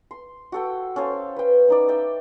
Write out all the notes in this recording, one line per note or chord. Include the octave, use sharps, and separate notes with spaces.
C6
F#4 A4 G5
C#4 A4 C5 F5
B4 G5
C#4 D#4 D5
D5 E5 G5